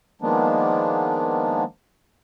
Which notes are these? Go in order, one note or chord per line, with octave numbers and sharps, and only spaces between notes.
D#3 F3 G#3 A#3 B3 D4